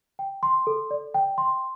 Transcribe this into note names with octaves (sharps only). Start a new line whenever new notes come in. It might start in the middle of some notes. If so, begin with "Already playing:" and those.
G5
C6
A4
D5
G5
C6